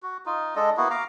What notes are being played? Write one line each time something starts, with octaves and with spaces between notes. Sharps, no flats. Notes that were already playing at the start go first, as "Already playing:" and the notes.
F#4
D#4 F4
G#3 D4 A4 D#5
A#3 B3 E4 F#4
F5 A#5 D6